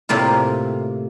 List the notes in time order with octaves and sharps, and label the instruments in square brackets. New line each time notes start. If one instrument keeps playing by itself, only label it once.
[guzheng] A2 C3 A#3 F4